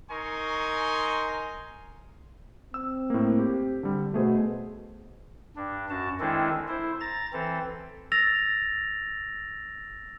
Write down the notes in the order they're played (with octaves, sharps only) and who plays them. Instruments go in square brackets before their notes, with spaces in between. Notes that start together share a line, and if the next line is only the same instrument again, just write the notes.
[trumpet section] D#4 A#4 G#5 C6 C#6
[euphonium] C4 [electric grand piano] E6
[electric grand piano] A2 A#3
G4
D3 G3
[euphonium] B2 [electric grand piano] A3 G#4 C5
[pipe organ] G2 D4
F#2 F#4 A5
D#3 G#3 C4 D4 E4 A4
E4 C5
A#5 A6
E3 C4 A4
[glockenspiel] E6 A6 A#6 F7